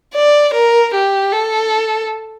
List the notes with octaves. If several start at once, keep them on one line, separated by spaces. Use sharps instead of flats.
D5
A#4
G4
A4